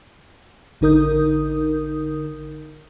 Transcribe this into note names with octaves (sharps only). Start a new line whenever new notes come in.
A1 D3 D#4 A#4 D#6 G6